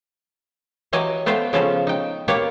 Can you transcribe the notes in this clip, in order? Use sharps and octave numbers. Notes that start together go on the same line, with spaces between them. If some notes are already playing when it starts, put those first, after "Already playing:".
E3 F#3 G4 D#5 G#5
A3 B3 C5 F5 G5
C#3 F3 B3 C#4 A4
D#4 G5
A#3 B3 G4 C#5